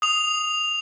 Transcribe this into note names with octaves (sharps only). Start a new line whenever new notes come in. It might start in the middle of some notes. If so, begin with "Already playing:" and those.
D#6 F7